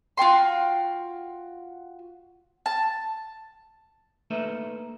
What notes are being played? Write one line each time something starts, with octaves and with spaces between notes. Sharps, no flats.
F4 F#4 G5 C6
A5
A3 A#3 D#4 A4 B4 E5